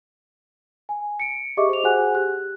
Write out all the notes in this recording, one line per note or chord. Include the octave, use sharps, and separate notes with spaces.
G#5
C#7 D7
G4 G#4 D#5 E5 C#6 D6
C5 F7
F#4 G#4 C5 F#5 G#5 F#6
G4 F#6